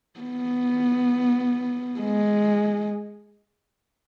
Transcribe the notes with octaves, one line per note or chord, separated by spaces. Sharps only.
B3
G#3